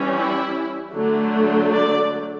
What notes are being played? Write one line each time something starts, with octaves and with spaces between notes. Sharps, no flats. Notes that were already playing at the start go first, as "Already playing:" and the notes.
Already playing: E3 G3 C#4
E4
D3 F#3 A3
D5